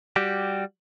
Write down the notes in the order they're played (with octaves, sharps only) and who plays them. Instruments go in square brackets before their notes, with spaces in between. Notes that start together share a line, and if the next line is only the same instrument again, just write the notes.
[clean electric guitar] G3 F#4 G4